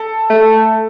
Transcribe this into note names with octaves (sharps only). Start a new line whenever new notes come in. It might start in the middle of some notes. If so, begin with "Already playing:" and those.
Already playing: A4
A3